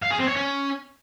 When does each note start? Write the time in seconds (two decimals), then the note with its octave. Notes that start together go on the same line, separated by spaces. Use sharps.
0.02 F5
0.11 G#4
0.19 C4
0.27 C#5
0.35 C#4